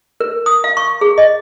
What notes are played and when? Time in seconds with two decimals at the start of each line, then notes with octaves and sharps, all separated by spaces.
0.20 A#4
0.46 D#6
0.64 F5
0.77 C#6
1.01 G#4
1.18 D#5